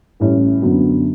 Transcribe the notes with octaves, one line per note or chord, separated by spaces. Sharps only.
A1 A2 G3 C#4 E4
F#2 D3 F#3 B3